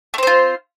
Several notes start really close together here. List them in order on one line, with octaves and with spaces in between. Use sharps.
A3 C4 C5 F4